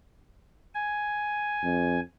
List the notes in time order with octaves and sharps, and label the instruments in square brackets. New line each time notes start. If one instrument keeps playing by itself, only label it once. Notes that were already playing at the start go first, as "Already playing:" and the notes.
[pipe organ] G#5
[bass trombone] F2